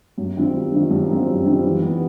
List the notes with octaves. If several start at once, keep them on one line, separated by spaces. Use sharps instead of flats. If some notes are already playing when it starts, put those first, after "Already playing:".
F#2
D#3 G3 C4 F4
F#2
D#3 G3 C4 F4
F#2
D#3 G3 C4 F4
F#2
D#3 G3 C4 F4
E3
G3 B3